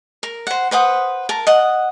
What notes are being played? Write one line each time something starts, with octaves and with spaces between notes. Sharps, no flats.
A#4
C5 F#5
B4 C5 F#5 D#6
A#4 A5
D#5 F#5